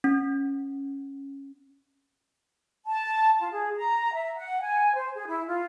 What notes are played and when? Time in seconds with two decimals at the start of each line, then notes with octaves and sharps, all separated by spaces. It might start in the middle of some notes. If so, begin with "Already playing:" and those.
0.04 C#4
2.86 A5
3.39 F4
3.52 G#4
3.76 A#5
4.14 E5
4.36 F#5
4.61 G#5
4.95 C5
5.14 G#4
5.27 E4
5.47 F4